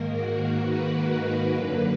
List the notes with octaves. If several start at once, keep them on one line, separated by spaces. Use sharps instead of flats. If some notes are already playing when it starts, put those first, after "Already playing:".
Already playing: G#2 D#3 A#3 A#4
F#4
B4
F#2 D3 F#3 A#3